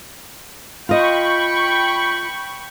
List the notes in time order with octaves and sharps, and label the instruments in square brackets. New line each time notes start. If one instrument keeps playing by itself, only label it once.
[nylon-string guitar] F4 D#5 [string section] G5 B5 C#6